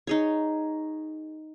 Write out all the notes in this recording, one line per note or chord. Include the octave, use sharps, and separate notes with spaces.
D#4 G#4 C#5